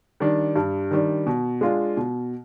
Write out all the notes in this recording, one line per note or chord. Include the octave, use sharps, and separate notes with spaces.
D#3 G3 D4
G2
D#3 G3 D4
B2
G#3 D4 F4
B2